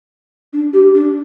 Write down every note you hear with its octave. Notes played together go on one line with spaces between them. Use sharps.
D4
G4
D4